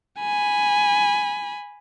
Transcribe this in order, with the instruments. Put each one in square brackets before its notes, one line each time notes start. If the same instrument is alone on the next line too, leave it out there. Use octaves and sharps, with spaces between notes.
[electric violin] G#5 B5